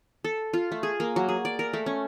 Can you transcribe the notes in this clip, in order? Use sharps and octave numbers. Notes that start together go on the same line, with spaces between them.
A4
F4
A3
G#4
A#3
F#3
G#4
D5
A#4
A3
C#4